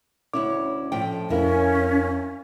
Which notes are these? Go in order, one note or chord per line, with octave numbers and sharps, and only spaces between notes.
D2 C#4 E4 C#5 D6
A2 F3 G5
F2 C#4 E4 A#4 F5